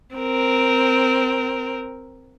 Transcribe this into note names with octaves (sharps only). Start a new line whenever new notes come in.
C4 A#4